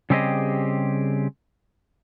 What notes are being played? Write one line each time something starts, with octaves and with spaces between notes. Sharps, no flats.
C#3 G3 C4 G4 G#4 D#5